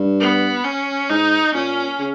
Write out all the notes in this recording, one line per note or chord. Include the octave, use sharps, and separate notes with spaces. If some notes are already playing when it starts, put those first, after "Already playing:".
Already playing: G2
B3
C#4
G#2 D#4
A#2 C#4
C#3